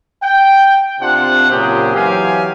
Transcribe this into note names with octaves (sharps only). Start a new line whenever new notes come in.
G5
C3 C4 D4 F4 F#5 C6
A#2 C#3 F#3 C4 G4 G#4
E3 F#3 C4 G4 F5 G#5